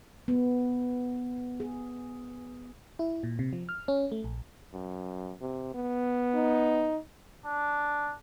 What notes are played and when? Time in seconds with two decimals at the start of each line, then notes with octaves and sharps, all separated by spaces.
0.28 B3
1.60 G#4
2.99 E4
3.23 A#2
3.39 C3
3.53 F3
3.69 F6
3.88 C#4
4.12 A3
4.24 A#1
4.73 F#2
5.41 C3
5.74 B3
6.35 D#4
7.46 D4